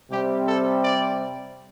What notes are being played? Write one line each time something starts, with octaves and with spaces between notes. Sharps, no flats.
C3 G3 C4 G4
A4
D5